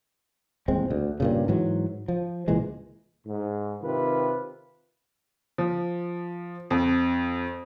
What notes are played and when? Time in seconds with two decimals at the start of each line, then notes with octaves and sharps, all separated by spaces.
0.68 D#1 E2 G#3 C4
0.90 D2
1.20 G2 A#2 C#3
1.48 G#2 E3 F#3
2.08 F3
2.48 C#2 A#2 E3 G#3
3.26 G#2
3.81 C3 D#3 F4 B4
5.58 F3
6.71 F2